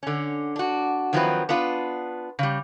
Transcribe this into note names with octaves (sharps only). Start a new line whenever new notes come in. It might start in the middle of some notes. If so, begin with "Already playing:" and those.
D3 C#4
D4 F#4
D#3 F3 F#3 C4 E4 B4
B3 D4 F4 B4
C#3 G3